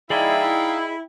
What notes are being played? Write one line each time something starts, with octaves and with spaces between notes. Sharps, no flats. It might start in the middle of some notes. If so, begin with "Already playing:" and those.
D#4 E4 G#4 D5 D#5 F5 G5